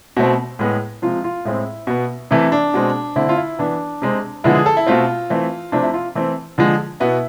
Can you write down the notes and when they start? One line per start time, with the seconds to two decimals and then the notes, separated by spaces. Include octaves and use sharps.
0.17 B2 A3 C4
0.59 A2 G#3 B3
1.02 C3 F3 G#3 F4
1.24 F4
1.45 A2 G#3 C4 E4
1.87 B2 B3
2.31 C3 E3 A3 E4
2.52 D4
2.74 B2 G#3 C4
3.16 D3 A3 C4 E4
3.29 F4
3.37 E4
3.59 E3 B3 D4
4.02 C3 G#3 C4
4.44 D3 F3 G#3 B3 E4
4.55 G#4
4.66 A4
4.77 E4
4.86 B2 A3 C4 F4
5.30 E3 A3 C4
5.72 C3 F3 A3 C4 D4
5.83 E4
5.94 F4
6.15 E3 A3 C4
6.58 D3 F3 G#3
7.00 B2 B3 E4